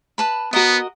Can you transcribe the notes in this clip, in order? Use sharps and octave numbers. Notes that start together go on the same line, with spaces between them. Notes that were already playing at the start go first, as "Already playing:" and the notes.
B4 A5 B5
B3 F#4 A#4 D#5